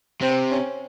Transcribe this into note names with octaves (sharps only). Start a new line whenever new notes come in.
C3 C4
C#4